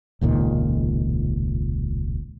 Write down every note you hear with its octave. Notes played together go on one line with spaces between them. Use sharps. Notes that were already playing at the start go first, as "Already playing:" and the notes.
E1 C#2 A#2 D#3